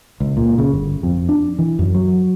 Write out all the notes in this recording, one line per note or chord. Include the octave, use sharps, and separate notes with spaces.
C#2
A#2
C#3
G1
F2
D4
E3
F#2
F#3